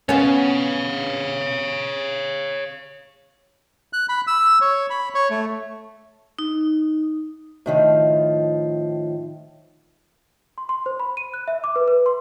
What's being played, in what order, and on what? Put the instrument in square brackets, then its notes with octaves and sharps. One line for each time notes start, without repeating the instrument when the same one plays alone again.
[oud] B3 C#4 [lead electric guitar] C#5 F5
[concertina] F#6
B5
E6
C#5
B5
C#5
A3
[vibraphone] D#4
[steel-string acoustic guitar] A2 D#3 F3
[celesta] C6
C6
C5
B5
D#7
F#6
E5
D6
B4
B4
C6